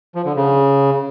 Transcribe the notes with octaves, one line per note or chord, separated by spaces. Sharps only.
F3
D3
C#3